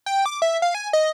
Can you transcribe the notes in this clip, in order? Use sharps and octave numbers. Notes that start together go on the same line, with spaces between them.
G5
D6
E5
F5
G#5
D#5